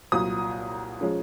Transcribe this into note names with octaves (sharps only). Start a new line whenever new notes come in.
C2 A#2 F#3 D#6
F3 G#3 C#4